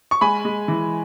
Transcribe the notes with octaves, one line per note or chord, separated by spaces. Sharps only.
C#6
G#3 G#5 B5
G#3
E3